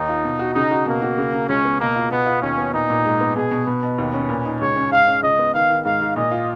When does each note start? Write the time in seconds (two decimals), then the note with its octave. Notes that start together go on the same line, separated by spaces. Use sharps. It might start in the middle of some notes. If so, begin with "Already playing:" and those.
Already playing: D#2 D#4
0.09 F4
0.25 B2
0.39 F#4
0.55 C#3 D#4
0.71 F#4
0.86 B2 A#3
1.02 F#4
1.18 C#3
1.33 C#3
1.49 C#2 C#4
1.65 B3
1.80 B2 A#3
1.96 F4
2.11 B2 B3
2.26 F4
2.42 D#2 C#4
2.58 B3
2.74 A#2 D#4
2.90 A#2
3.05 G#2
3.21 B3
3.36 B2 G#4
3.51 B2
3.67 B2 B4
3.83 B2
3.98 D#2
4.14 C#4
4.29 A#2
4.45 D#4
4.60 C#2 C#5
4.76 C#4
4.91 G#2 F5
5.07 C#4
5.23 C#2 D#5
5.39 B3
5.54 D#3 F5
5.70 D#3
5.85 G#2 F5
6.01 G#2
6.16 A#2 D#5
6.31 F4